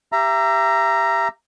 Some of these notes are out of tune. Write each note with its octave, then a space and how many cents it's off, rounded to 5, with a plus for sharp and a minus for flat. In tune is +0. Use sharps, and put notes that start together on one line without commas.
G4 +0 E5 +35 A#5 +0